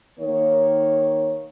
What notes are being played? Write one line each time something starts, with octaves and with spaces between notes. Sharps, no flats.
D#3 A#3 C#5